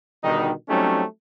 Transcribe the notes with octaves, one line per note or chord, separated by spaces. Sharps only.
B2 D3 D#3 G3 D#4
F#3 G3 A3 C4 C#4 D#4